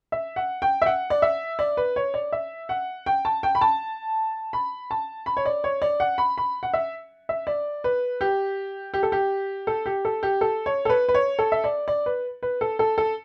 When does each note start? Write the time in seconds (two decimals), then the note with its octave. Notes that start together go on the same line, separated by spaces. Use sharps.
0.12 E5
0.36 F#5
0.62 G5
0.82 E5
0.86 F#5
1.10 D5
1.22 E5
1.59 D5
1.77 B4
1.96 C#5
2.14 D5
2.32 E5
2.69 F#5
3.06 G5
3.25 A5
3.43 G5
3.55 B5
3.61 A5
4.53 B5
4.91 A5
5.26 B5
5.37 C#5
5.46 D5
5.64 C#5
5.82 D5
6.00 F#5
6.18 B5
6.38 B5
6.63 F#5
6.74 E5
7.29 E5
7.47 D5
7.84 B4
8.21 G4
8.94 G4
9.03 A4
9.12 G4
9.67 A4
9.86 G4
10.05 A4
10.23 G4
10.41 A4
10.66 C#5
10.85 A4
10.89 B4
11.09 B4
11.14 C#5
11.39 A4
11.52 E5
11.64 D5
11.88 D5
12.06 B4
12.43 B4
12.61 A4
12.79 A4
12.98 A4